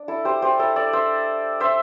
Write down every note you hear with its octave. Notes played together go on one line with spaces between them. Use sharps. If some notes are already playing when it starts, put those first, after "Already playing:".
Already playing: D4
E4 A4
G4 C5
G4 C5
E4 A4
A4 D5
C5 E5
C5 E5